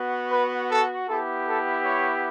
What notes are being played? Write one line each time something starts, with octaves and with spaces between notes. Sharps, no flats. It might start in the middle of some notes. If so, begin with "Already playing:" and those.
Already playing: B3 F#4
B4
A4
B3 E4 G4 A4
A4
C#5